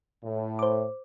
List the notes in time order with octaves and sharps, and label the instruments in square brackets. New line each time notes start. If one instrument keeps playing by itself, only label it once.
[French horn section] A2
[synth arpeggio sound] C5 D6